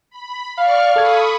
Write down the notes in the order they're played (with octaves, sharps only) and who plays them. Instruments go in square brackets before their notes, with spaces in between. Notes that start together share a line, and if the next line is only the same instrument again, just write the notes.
[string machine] B5
[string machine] D5 C#6 F6 [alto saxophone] F5
[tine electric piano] A4 G#6 [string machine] B5 C#6 D#6